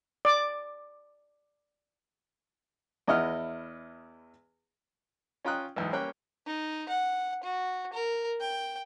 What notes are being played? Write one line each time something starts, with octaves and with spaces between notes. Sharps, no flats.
D5 D6
E2 E4 D#5 F#5 F6
C#4 F4 G5 A#5 D#6 F#6
B1 E2 G#2
G3 A#3 C#4 C#5 G5 F#6
D#4
F#5
F#4
A#4
G5